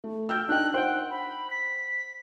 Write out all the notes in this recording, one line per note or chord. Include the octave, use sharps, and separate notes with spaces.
A3
G5 E6 F6 G6
D4 D#4 G5 F#6
C5 F#5 G5
B5
B6